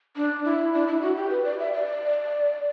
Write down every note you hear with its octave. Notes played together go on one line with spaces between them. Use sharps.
D4
E4
D4
E4
F#4
G4
B4
D5
E5
D5